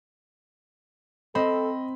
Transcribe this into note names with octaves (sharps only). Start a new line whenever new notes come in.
C4 A4 D#5 B5